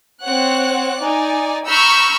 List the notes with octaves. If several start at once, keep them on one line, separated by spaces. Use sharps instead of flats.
C4 C#5 F#5 F#6
D#4 D5 G#5
A#5 B5 C#6 E6 F6 G6